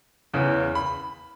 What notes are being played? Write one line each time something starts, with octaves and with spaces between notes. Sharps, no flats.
E2 C#3 E3
B5